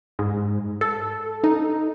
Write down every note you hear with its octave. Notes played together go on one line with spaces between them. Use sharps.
G#2
A4
D#4